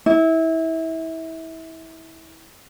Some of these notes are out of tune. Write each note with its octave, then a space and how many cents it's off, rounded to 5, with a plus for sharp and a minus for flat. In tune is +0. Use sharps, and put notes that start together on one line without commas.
E4 -25